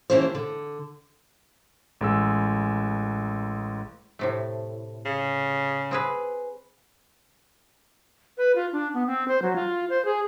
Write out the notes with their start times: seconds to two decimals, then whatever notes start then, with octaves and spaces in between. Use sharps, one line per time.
0.10 E3 A#3 C#4 D4 G4 C5
0.35 D3
2.01 A1 G#3 E6
4.19 A2 C3 A3
5.06 C#3
5.91 C4 G#4 B4
8.38 B4
8.56 F4
8.72 D4
8.94 B3
9.07 C4
9.28 C5
9.42 F#3
9.56 F4
9.90 C5
10.05 G#4